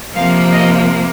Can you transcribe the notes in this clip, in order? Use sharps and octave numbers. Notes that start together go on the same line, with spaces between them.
C3 F3 A#3 F5
D#5